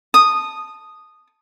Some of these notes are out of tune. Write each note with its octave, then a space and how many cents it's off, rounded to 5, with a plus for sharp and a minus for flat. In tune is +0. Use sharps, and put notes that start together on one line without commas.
A5 +0 D#6 -10